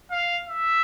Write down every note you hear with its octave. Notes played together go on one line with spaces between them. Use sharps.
F5
E5